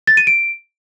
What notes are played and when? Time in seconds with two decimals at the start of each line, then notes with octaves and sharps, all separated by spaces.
0.07 A6
0.17 D#7
0.27 D7